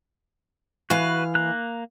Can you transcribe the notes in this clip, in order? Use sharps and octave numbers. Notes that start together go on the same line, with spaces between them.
E3 F#4 B4 F5
A#3 A#5 F#6